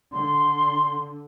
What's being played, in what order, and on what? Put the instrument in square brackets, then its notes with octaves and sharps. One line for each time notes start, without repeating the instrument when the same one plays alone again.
[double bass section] D3 [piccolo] C6